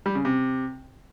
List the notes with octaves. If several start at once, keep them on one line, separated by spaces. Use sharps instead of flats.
G3
C#3
C3